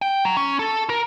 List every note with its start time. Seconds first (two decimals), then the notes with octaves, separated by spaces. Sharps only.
0.02 G5
0.25 F#3
0.37 C#4
0.59 A4
0.90 A#4